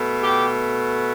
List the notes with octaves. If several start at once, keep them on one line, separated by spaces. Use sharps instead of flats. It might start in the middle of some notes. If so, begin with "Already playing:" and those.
Already playing: B2 A3
G4